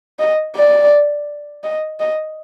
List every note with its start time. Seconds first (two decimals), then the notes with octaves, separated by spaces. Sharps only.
0.19 D#5
0.56 D5
1.64 D#5
2.00 D#5